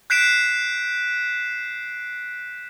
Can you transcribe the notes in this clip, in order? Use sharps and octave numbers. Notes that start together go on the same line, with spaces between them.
F#6 G6 B6 C7 D7 E7